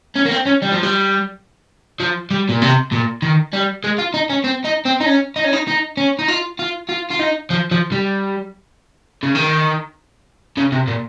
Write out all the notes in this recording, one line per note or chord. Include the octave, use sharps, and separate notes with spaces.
C#4
A#3
C4
C#4
G3
F3
G3
F3
G3
A#2
C3
A#2
D#3
G3
G#3
F4
D#4
C#4
C4
D#4
C4
D#4
C#4
D#4
C#4
D#4
D#4
C#4
D#4
F4
F4
F4
F4
D#4
F3
F3
G3
C#3
D#3
C#3
C3
A#2